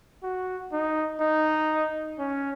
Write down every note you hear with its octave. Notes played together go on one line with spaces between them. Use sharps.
F#4
D#4
D#4
C#4